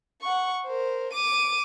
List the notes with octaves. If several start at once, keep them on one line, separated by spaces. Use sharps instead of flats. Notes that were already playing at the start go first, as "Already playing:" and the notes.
F#5 C#6
A#4 C5
D6 D#7